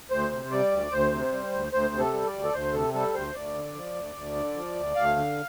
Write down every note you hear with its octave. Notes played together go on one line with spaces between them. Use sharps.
D2 C5
C3
G3 D5
D2
D2 C5
C3
G3
D2
D2 C5
C3
A4
G3
D5
D2
A4
D2 C5
C3 A4
G3 A4
D2 C5
D2 D5
D3
F3
D2
D2
D3
F3
D2
D2 F5
D3